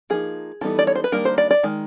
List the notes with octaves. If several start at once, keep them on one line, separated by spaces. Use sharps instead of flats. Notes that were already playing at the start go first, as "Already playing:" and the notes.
F3 A#3 D#4 G#4
E3 G3 B3 D#4 A4
D5
C#5
C5
B4
D#3 G3 A#3 D4 A#4
C5
D5
D5
D#3 G#3